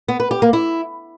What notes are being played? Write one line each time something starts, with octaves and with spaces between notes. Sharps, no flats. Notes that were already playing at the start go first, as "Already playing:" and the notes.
B3
B4
G4
A#3
E4